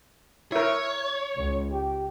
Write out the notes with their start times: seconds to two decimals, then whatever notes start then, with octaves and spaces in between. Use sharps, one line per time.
0.52 E4 A#4 C#5
1.35 C#2
1.72 G4